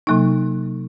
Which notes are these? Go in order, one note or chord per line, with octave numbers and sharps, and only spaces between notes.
C3 F#3 A#3 D#4